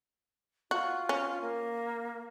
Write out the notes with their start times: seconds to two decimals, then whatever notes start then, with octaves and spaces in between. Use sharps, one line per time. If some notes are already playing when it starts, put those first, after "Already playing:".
0.71 F4 F#4
1.09 C#4
1.41 A#3